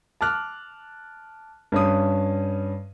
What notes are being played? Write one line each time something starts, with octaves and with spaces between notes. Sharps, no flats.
A5 D6 F6 F#6
G2 C#4 D#6